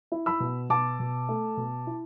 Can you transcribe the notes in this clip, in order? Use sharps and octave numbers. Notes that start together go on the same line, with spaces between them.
E4
B5 E6
B2
B2 A5 D6
B2
A3
B2
E4